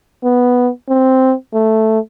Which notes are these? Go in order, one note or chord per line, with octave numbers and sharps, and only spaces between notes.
B3
C4
A3